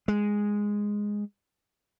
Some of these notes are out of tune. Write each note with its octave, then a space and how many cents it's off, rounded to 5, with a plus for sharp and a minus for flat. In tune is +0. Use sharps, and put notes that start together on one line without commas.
G#3 -5